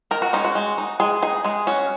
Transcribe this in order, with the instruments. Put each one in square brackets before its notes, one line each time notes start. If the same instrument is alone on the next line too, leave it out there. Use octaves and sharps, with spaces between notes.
[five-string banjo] D#3 A#4
F#4
G#3 C#4 D#4
F#4
G#3
D#4
G#3 G#4
D#4 G#4
G#3 G#4
C#4 F#4